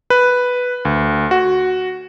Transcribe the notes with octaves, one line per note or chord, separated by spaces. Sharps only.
B4
D2
F#4